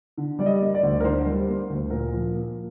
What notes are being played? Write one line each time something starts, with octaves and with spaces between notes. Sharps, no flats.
D3
G3 D5
D#5
A#3
D5
D2
A#4
D3 C5
G3
A#3
D2
A#2 A#4
F3
A#3